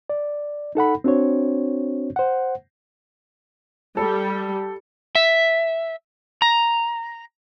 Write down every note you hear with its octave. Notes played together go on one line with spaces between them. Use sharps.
D5
D#4 A4 F#5 B5
C4 D4 F#4 C5 C#5
C5 F#5
G3 A4
E5
A#5